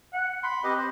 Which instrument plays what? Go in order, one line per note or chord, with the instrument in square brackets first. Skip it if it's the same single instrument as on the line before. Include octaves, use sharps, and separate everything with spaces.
[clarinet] F#5
[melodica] B5 [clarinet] C6
[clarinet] C4 [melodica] G4 B4 D#5
[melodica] C5